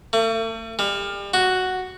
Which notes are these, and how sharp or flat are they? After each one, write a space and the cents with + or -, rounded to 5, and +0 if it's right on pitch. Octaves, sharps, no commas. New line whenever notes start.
A3 +40
G3 +35
F#4 +0